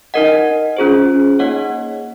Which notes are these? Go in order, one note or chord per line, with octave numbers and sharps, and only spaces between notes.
D#4 A#4 D#5 F#5
C#4 F4 G#4 C5
A#3 D#4 G#4 C#5 F#5